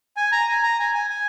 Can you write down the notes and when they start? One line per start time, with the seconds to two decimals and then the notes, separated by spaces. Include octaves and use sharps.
0.17 G#5
0.32 A#5
0.48 G#5
0.63 A#5
0.80 G#5
0.94 G#5
1.10 G#5